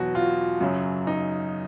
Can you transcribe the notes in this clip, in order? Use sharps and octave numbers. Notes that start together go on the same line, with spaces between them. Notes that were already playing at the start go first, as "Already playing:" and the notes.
Already playing: E2 B2 F#3 F#4
F4
F#2 C#3 F#3
D#4